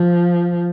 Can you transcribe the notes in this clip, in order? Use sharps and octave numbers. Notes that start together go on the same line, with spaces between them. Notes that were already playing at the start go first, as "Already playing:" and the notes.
Already playing: F3